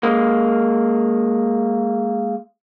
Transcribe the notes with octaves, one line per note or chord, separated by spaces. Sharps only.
G#3 A#3